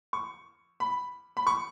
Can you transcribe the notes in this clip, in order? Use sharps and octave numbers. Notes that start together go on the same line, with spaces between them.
C#6
B5
B5
C#6